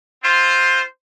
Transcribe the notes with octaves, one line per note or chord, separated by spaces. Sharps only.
C4 F4 C5